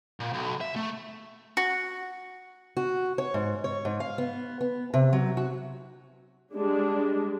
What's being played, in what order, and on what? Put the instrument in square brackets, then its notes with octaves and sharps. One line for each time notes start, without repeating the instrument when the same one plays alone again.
[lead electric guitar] A#2
B1
E5
A3
[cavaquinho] F#4
[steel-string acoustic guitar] F#4
C#5
G#2
C#5
G#2
F5
B3
B3
C3
F#3
F#4
[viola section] G3 G#3 D4